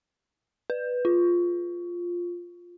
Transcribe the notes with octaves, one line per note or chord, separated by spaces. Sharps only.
B4
F4